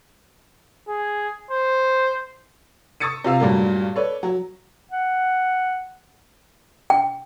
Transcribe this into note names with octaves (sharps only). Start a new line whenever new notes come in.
G#4
C5
C#6 D#6 E6 A6 C#7 D#7
C3 F4 F5 E6
G2 A#2 F#3 G3 A3 A#3
A4 B4 C#5 D5
F#3
F#5
G5